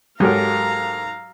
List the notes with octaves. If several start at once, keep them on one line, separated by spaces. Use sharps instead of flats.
G#2 F#3 G4 A4 A#4 F5 A#5